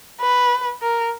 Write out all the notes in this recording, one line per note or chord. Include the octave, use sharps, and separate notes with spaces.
B4
A#4